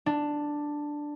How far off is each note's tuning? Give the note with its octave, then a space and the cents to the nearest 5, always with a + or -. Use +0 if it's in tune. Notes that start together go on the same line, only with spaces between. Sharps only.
D4 +5